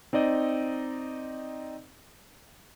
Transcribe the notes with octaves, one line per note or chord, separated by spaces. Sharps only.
C4 D#4 D5 D#5